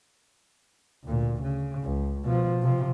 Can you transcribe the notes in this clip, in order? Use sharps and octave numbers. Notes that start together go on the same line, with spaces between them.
D2 A#2
C#3
C#2
B2 F3
C3 F3